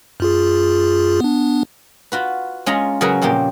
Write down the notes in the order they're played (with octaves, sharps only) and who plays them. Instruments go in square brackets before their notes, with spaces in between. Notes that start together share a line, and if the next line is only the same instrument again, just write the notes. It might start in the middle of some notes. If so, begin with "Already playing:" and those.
[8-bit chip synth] F#2 F4 G#4
B3 D4
[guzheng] F4 F#4 B4
G#3 C#4 F4 G#4 F5 A#5
C#3 F#3 C#4 G#4 A#4 B4
F2 A#2 A#3 G4